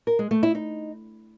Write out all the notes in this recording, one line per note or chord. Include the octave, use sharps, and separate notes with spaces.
A#4
G#3
A3
E4
D#4